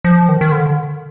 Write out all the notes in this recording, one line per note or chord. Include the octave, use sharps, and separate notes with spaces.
F3
D#3
D#3
D3